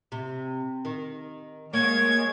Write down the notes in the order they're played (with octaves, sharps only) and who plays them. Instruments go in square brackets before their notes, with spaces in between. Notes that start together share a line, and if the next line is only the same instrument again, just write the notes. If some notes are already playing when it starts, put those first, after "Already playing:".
[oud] C3
D#3
[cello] G#3 [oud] A#3 [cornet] C#5 [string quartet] G#6